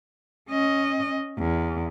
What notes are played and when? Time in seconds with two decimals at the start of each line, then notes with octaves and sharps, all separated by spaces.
0.50 C#4 D#5
1.39 E2